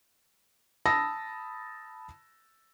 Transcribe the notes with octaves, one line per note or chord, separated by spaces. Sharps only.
A5 B5 D#6 E6 A#6